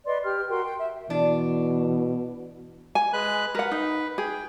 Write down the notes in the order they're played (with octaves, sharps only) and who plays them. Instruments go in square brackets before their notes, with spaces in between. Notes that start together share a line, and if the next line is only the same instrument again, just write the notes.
[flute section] B4 D5 D#5 C6
G4 F6
F#4 A#4 G5 C6
G5
E5
[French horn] B2 [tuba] E3 [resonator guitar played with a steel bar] D4
[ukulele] G#5
[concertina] G#3 B4 F#6
[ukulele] A#4 F#5 [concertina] B4
[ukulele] D#4
[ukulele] G#4 [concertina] G5